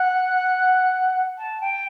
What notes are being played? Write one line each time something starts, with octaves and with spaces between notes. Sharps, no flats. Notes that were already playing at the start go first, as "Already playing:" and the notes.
Already playing: F#5
A5
G5